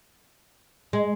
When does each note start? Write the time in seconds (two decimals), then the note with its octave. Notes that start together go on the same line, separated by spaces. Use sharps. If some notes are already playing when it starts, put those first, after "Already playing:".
0.93 G#3